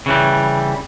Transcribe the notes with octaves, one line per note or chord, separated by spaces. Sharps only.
C#3 E3 G3